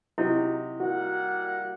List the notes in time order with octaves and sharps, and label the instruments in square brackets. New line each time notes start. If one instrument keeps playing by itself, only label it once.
[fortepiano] C3 F#3 D#4 [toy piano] E4
[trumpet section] G3 A#3 F#5 [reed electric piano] F#4